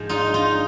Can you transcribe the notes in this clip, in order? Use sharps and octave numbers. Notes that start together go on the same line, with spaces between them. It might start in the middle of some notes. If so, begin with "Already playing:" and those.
Already playing: G#2 F3 G#3 A#3
D#4 F4
D#4 F4